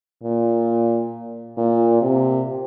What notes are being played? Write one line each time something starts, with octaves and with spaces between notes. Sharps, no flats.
A#2
A#2
C3